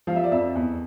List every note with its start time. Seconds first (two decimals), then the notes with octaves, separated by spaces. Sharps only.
0.07 F3 F5
0.16 E5
0.24 D5
0.31 F2 E5
0.55 E2